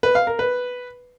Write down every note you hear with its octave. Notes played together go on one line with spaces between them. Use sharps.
B4
F5
A#4
B4